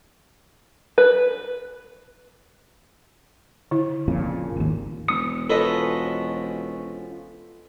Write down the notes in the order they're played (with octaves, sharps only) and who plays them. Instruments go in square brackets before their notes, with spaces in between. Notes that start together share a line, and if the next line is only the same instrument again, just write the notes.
[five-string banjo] B4
[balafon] D3 E4
[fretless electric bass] F2 A#2 C#3
G#1 D#2
[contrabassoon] E1 [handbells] D#6 C#7
[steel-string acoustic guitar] F3 C#4 F#4 [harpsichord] A4 B4 D#5